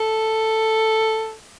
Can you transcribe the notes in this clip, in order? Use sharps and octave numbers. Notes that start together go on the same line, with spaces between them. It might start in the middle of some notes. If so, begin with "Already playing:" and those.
Already playing: A4